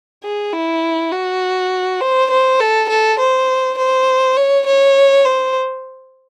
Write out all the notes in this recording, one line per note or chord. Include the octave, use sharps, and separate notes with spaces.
G#4
E4
F#4
C5
C5
A4
A4
C5
C5
C#5
C#5
C5